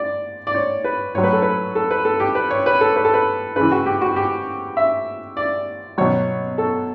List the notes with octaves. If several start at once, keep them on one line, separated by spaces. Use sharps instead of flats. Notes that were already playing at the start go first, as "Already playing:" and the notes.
Already playing: D5
D5
C#5
B4
A2 F#3 C#5
B4
A4
B4
A4
B4
A4
G4
B4
C#5
B4
A4
B4
A4
B4
C#3 E3 B4
F#4
G4
F#4
G4
E5
D5
B2 F#3 C#5
A4